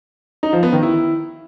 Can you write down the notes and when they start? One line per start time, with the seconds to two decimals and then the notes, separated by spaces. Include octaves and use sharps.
0.43 D#4
0.53 F3
0.63 B3
0.73 D#3
0.83 E4